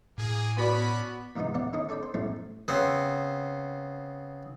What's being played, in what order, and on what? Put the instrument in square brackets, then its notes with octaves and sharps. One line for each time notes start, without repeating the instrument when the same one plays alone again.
[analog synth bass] A2 [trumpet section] A#3 G#4
[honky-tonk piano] B3 F#4 D5 [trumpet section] C#4 D4 B5
[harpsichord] D#2 G#2 C3 F3 B3 D#4
A1 B3 G4 D5 F#5
D3 D#3 C#4 D4 D#5
C#4 A4 D5 G5 B5
C5
F#2 A2 F#3 G3 A3 C4
C#3 B3 C4